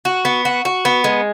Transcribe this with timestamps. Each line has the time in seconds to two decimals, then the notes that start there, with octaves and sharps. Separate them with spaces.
0.05 F#4
0.25 B3
0.45 F#4
0.65 F#4
0.85 B3
1.04 G#3